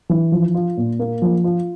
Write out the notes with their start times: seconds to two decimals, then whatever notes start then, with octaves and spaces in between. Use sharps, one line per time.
0.09 E3
0.32 F3
0.54 F4
0.77 A#2
0.99 A#3
1.22 F3
1.44 F4